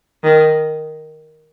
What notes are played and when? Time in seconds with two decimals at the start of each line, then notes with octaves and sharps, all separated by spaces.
0.24 D#3